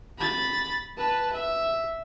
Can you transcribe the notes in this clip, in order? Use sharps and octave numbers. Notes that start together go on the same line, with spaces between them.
B5 A6
B4 A5
E5